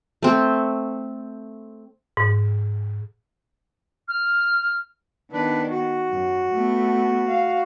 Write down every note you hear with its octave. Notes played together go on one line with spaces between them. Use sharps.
A3 C4
G#2
F6
D#3 B3 D4 B4
F#4
F#2
A3 B3
F5